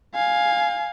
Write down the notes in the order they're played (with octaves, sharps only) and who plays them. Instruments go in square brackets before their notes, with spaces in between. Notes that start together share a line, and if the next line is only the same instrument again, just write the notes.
[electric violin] F5 G#5